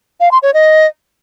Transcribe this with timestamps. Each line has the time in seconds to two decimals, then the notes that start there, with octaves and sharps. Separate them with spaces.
0.20 F5
0.31 C6
0.43 C#5
0.54 D#5